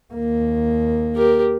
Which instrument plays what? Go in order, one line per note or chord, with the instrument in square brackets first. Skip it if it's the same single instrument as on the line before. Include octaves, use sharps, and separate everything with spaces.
[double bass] D#2 A#3
[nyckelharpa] G4 A#4